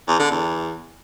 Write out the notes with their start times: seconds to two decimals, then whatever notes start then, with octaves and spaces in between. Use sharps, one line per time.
0.08 E2
0.20 D3
0.31 E2